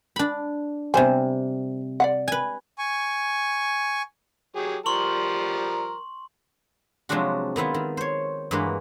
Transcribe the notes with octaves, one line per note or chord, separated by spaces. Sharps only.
D4 B5
C3 G3 B3 C5 G#5
D5 F5 F#5
B4 G#5
G#5 C#6
F#3 G4 G#4
F3 G3 A#4 C6 C#6 F#7
C3 F3 F#3 G#3 D4 F#4
D#3 B3 E4 F4
D#3
C5 C#5
G2 E3 G#3 A#3 F#4